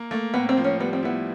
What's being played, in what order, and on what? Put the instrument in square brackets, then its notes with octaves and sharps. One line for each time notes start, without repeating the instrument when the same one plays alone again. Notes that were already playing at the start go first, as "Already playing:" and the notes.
Already playing: [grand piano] A#3
[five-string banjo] A3 [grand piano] A#3
[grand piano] A2 [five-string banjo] B3
[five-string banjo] C4
[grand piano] F3
[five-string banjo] C#4
[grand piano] G3 [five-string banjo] B3
[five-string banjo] C4
[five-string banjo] B3 [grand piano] E4